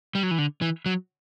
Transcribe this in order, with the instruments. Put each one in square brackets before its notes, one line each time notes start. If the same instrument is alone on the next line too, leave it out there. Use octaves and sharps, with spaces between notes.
[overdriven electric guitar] G3
F#3
E3
D3
E3
F#3